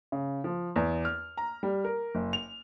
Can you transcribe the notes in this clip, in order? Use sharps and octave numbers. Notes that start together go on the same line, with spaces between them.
C#3
F3
E2
F6
A#5
G3
A#4
F#1
F7